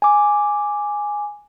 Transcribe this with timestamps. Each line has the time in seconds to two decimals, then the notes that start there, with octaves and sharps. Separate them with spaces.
0.02 G#5 D6